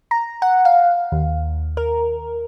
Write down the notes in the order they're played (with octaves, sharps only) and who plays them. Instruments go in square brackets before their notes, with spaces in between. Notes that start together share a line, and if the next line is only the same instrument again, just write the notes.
[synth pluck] A#5
F#5
F5
D#2
A#4